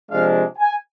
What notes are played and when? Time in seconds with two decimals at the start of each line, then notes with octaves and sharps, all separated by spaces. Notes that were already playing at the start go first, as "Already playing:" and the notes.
0.10 C3 F3 G#3 D4 F5
0.58 G#5